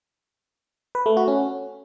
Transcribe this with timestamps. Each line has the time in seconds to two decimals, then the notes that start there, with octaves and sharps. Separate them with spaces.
0.95 B4
1.06 A3
1.17 F#4
1.28 C#4